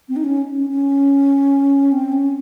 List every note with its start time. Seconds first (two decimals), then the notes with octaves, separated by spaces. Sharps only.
0.09 C4
0.16 D#4
0.24 C#4
0.54 C#4
0.69 C#4
1.92 C4
2.12 C#4